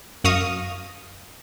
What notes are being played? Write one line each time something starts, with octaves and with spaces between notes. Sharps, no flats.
F#2 F5 C#6 D#6 A#6